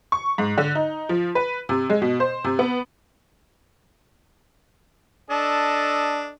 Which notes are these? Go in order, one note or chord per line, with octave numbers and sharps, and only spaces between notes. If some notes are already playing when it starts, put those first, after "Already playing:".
C#6
G#2
D3
D#4
F3
B4
C3
G#3
B2
C5
C3
B3
D4 A4 D#5